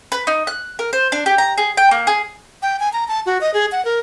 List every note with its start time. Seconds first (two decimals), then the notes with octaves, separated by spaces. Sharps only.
0.12 B4
0.27 D#4
0.47 F#6
0.79 A#4
0.93 C5
1.12 D4
1.26 G4
1.38 A#5
1.58 G#4
1.77 G5
1.91 A#3
2.07 G#4
2.62 G5
2.80 G#5
2.93 A#5
3.08 A5
3.26 F#4
3.41 D#5
3.54 G#4
3.72 F#5
3.85 A#4